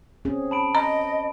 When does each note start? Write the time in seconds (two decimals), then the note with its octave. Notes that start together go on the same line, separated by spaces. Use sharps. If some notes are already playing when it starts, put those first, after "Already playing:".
0.25 C4 C#4 G#4
0.51 A5 B5 D7
0.75 D#5 A#5